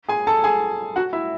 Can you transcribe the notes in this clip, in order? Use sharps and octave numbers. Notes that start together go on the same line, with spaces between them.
G#4 G#5
A4 A5
G#4 G#5
F#4 F#5
E4 E5